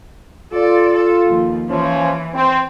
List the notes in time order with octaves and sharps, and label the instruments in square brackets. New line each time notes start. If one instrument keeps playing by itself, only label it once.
[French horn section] F4 [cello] A4 D5
[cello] A4
D#2 F3
[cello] E3 [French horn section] F3 C#4
[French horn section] C4